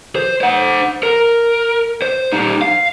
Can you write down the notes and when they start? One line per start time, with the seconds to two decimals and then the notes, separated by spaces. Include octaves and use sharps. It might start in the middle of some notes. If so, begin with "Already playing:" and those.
0.16 C5
0.41 C5 F#5
1.03 A#4
2.02 C5
2.32 G3 D#4
2.62 F5